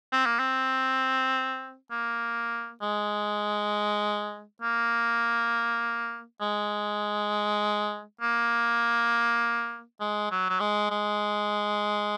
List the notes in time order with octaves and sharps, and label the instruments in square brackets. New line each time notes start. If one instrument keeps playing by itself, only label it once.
[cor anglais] C4
A#3
C4
A#3
G#3
A#3
G#3
A#3
G#3
F#3
F#3
G#3
G#3